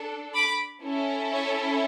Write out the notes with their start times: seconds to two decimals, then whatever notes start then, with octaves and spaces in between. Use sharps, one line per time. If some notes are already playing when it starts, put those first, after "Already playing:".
Already playing: D4 A4
0.33 B5 D6
0.82 C#4 E4 A4
1.31 C#5 E5